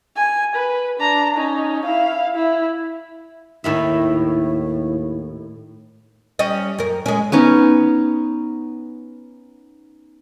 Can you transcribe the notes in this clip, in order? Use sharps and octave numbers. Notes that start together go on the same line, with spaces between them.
G#5
B4
D4 A#5
C#4 D#4
E4 F5
E4
D#2 A2 D#3 E4 E5
G3 C#4 D#5
F#2 A#4
G#3 C#4
B3 C#4 D#4